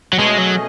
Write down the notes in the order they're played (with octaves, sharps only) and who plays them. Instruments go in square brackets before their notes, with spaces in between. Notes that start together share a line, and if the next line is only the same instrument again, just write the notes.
[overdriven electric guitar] F#3
[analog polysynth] B2 A3 C#4 G#4 D#5 [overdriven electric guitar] G#3
[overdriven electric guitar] F#3